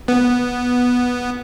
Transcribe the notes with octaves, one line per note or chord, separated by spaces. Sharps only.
B3